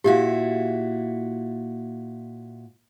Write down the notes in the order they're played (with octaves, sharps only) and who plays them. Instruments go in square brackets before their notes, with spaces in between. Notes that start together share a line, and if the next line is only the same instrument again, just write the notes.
[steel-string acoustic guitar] A#2 E4 F#4 [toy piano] G4 F5